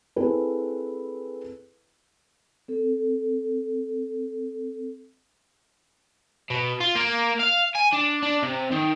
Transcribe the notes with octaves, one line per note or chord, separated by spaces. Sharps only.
C4 E4 G#4 A4 B4
C4 A4
B2
F4
A#3
F5
G#5
D4
D4
C3
D#3